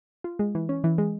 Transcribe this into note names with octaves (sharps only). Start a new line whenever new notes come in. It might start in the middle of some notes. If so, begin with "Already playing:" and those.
F4
G#3
E3
C#4
E3
G#3